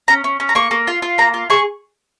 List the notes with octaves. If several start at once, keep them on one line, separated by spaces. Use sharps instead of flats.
C#4 A#5
C#4
C#4
A#5
A#3 C#6
A#3
F4
F4
A#3 A#5
F4
G#4 C#6